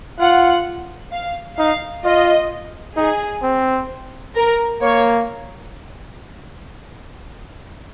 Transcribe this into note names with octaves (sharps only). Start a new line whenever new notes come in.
F4 F#5
F5
D#4 F5
F4 D#5
D#4 G#4
C4
A#4
A#3 C#5